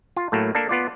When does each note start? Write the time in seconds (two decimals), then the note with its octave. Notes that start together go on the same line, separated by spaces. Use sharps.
0.17 F4
0.32 A2 F#3 A3 A#3
0.55 A#3 D4 A4
0.69 B3 F4 D5